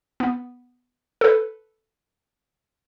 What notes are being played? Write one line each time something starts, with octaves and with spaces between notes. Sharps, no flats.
B3
A4 B4